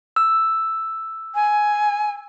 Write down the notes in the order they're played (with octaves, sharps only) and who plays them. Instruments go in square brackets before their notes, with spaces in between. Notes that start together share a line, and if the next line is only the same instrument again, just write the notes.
[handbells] E6
[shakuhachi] G#5